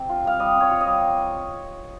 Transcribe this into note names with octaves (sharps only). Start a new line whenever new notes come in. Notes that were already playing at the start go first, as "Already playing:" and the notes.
Already playing: C3 C4
F4
G3 F5
G3 D#5
C4
C#5
F4
D#5
G3